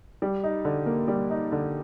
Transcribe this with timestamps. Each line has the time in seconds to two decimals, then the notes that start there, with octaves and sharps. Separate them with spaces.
0.22 G3
0.44 D#4
0.65 D3
0.86 A#3
1.08 G3
1.30 D#4
1.52 D3